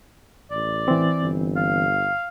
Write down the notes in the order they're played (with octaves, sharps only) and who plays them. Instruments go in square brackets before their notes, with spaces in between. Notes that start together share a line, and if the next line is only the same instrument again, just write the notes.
[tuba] A1 [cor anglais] D5
[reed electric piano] E3 C4
[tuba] G1
[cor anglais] F5